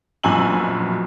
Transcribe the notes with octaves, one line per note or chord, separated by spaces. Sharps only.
A#1 F#2 B2 G#5 E6 F#7